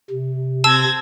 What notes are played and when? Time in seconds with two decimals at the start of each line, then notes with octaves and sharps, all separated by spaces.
0.10 C3
0.64 C4 A5 E6 G#6 A#6